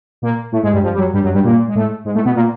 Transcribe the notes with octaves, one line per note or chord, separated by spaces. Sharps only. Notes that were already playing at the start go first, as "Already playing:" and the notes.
A#2 A#3
A2 A3
G#2 G#3
G2 G3
F2 F3
G3
F#2 F#3
G2 G3
F#2 F#3
G2 G3
A#2 A#3
G#3
A2 A3
G#2 G#3
A2 A3
B2 B3
A#2 A#3